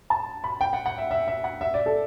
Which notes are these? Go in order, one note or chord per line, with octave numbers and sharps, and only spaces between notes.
A5
B5
G5
F#5
F#5
E5
E5
E5
F#5
E5
D5
A4